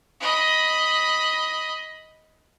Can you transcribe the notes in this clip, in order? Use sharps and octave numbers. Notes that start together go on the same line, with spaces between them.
D#5 B5